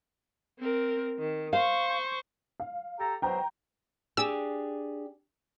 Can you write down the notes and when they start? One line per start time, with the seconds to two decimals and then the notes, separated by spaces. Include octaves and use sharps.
0.59 C4 A#4
1.19 D#3
1.53 C5 F5 C#6
2.60 F5
2.98 G4 A4 A#5
3.22 B2 F#3 C5 G5 A#5
4.17 D4 G4 G#4 E6